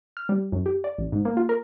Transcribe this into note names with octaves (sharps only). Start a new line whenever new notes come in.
F6
G3
F#2
G4
D5
A1
G#2
A#3
F4
A#4